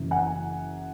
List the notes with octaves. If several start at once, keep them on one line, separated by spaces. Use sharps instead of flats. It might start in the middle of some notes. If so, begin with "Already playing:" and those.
Already playing: F#1 F#2 C#3 E3
F#5 G#5